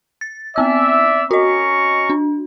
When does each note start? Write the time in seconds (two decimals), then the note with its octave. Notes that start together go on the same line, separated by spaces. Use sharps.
0.21 A6
0.56 B3 C4 D5 E5 E6
1.31 C#4 F#4 D#5 A#5 C#6
2.10 D4